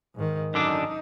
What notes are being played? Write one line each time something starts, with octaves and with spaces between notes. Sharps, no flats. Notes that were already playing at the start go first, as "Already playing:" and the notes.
G#2 D#3
F#2 D3 D4 D#4